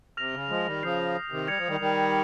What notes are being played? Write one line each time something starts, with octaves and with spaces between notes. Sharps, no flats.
C3 F6 A#6 F7
C#3
F3 G#3
D#3 G3
C#3 F3 D#6 G6 C7
C3 D#3
G3 G#6 C#7 F7
F3
D#3 G3
D#3 G3